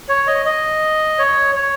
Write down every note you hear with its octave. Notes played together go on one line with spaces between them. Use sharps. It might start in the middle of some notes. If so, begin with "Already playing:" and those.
C#5
D#5
D#5
C#5
C#5